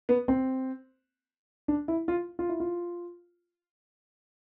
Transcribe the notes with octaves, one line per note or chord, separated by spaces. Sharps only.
B3
C4
D4
E4
F4
F4
E4
F4